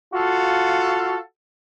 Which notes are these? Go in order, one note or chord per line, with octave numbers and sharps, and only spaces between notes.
F4 F#4 A4 F5